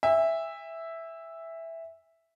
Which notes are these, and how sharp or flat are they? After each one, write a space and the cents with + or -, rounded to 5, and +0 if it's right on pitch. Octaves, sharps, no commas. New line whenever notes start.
E5 +0 G#5 -45